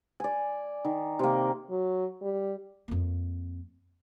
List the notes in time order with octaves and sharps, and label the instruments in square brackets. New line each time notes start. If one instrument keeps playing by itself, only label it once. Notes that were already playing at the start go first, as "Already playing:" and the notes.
[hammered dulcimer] D5 G#5
D#3
C3 A#3
[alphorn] F#3
G3
[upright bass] F2 A#3